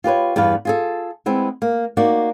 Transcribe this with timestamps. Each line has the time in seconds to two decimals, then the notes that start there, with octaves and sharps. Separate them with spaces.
0.04 F4 G4 B4 C#5
0.36 E2 G2 B3 B4 F5
0.65 F4 G#4 A4
1.26 G#3 B3 C4 E4
1.62 A#3
1.97 A#3 D#4 F#4 D5